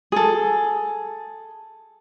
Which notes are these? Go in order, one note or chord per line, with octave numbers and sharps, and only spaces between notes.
G#4 A4